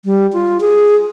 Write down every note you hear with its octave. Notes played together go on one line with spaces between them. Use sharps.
G3
F4
G#4